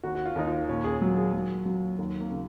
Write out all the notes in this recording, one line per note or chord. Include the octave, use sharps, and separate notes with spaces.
D#2 F#4
F#4
F4
D#2 D#4
F4
A#2 C#4
G#4
F#3
G#4
F#3
F#3
D#2
A#3
C#3